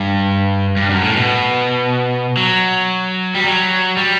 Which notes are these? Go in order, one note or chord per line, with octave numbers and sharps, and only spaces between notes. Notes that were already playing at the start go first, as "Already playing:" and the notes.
Already playing: G2
G2
F#2
A2
B2
F#3
G3
F#3
G3